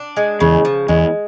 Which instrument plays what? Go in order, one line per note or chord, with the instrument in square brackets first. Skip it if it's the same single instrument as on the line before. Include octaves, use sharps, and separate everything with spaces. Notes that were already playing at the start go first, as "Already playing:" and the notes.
Already playing: [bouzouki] D4
G#3
[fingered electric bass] E2 [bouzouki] C#3
[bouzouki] F3
[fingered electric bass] E2 [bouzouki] G#3